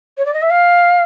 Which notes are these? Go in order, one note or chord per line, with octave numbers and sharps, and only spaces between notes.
C#5
D5
D#5
E5
F5